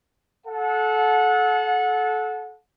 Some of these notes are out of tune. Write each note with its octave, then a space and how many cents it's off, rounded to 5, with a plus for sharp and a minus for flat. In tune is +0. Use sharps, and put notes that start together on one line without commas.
A4 -25 F#5 -25